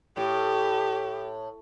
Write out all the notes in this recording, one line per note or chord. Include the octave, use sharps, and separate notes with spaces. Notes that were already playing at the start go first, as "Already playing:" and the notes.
A2 G4